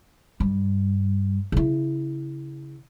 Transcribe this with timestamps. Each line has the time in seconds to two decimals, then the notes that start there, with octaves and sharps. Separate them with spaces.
0.40 G2 G3
1.52 C#3 E4